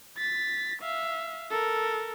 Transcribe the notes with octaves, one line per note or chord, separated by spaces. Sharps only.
A6 B6
E5 F5
A4 A#4